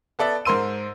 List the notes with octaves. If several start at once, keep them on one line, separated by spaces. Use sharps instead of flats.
B3 A4 D5 E5
G#2 A#4 C5 C6 E6 D#7